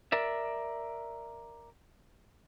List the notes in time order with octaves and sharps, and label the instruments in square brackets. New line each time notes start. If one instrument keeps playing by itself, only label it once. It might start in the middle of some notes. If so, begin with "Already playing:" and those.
[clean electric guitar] A#4 D5 E5